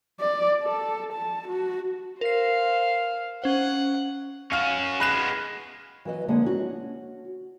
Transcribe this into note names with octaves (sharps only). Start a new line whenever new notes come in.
D5
A4
A5
F#4
A#4 C5 F5 C7
C#4 C5 F#5
C#4 F#4 F5 F6
G#3 B3 B5 F#6 E7
E3 F#3 B4 D#5
F2 D3 G#3 A#3 G#4 D#5
C#4 F#4